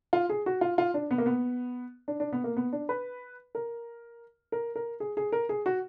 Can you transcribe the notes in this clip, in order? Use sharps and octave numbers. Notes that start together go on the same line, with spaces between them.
F4
G#4
F#4
F4
F4
D4
B3
A#3
B3
D4
D4
B3
A#3
B3
D4
B4
A#4
A#4
A#4
G#4
G#4
A#4
G#4
F#4